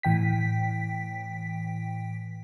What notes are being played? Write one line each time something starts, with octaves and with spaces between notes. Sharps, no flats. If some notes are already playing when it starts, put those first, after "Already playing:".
A2 E3 G5 B6